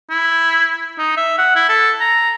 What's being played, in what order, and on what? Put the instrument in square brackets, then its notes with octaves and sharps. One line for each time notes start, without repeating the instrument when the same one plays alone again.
[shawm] E4
D#4
E5
F#5
E4
A4
A#5